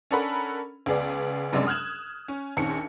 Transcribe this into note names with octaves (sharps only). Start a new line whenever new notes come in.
C#4 D4 A4 A#4 F#5 B5
C#2 B3 G#4 D5
F#2 C3 G3 G#3 C#4 D4
D#6 F6 F#6 G#6 E7
C#4
A#1 D#2 C4 C#4 C#7